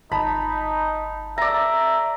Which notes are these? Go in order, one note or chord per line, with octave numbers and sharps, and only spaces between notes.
G1 D#4 A5 B5
A4 D5 E5 A#5